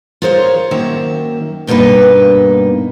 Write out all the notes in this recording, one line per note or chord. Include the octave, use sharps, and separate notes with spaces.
F4 G#4 A#4 C5 C#5 F5
F#2 D#3 A#3 E5
G2 B2 A#3 D#4 B4